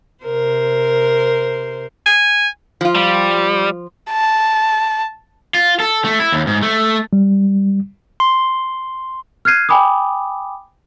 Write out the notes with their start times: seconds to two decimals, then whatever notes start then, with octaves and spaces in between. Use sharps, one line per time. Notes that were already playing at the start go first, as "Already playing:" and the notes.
0.24 C3 A#4 C5
2.06 G#5
2.81 F3 F4
2.95 G3
4.11 A5
5.55 F4
5.80 A4
6.05 A3
6.20 E4
6.32 D#2
6.47 G#2
6.63 A3
7.13 G3
8.20 C6
9.45 F6 F#6 G#6 C7 D#7
9.69 G5 G#5 B5 D6 D#6